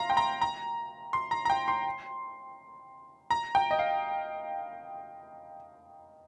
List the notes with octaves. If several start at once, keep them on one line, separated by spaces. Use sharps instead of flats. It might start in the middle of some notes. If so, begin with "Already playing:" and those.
Already playing: F5 A#5 C6
G5
A#5
A#5
C6
A#5
A#5
G5
C6
A#5
G5
D#5
F5